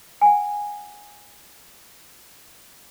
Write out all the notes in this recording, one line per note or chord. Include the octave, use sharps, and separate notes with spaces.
F#5 G#5